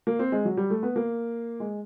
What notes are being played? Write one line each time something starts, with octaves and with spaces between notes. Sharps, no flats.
A#3
C4
G#3
F#3
G3
A3
B3
A#3
G#3